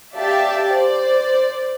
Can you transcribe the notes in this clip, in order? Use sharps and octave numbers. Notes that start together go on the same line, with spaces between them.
G4 D5 E5 F5 G5 A5
C5 D5